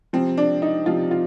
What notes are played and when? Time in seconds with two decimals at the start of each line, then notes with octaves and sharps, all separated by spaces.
0.13 C3 F3 C4
0.37 D4
0.62 D#4
0.86 C3 F3 F4
1.11 F4